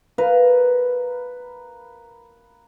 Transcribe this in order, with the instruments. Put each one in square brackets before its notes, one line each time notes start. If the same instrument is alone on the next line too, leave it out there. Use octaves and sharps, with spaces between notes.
[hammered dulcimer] A#4 B4 F5